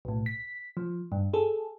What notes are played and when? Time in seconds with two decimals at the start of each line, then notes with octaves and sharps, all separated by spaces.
0.05 B1 A2
0.26 B6
0.77 F3
1.12 G2
1.33 G#4 A4